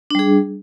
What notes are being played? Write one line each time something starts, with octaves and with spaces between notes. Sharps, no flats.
G3 D4 G#4